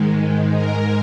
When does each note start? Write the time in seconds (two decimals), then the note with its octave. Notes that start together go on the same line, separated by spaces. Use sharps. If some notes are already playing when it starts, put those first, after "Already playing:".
Already playing: G#2 D#3 G#3
0.50 G#2 G#3 A#4